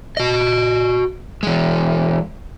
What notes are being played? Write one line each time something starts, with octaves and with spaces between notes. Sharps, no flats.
F#4 D#5
E3 G#3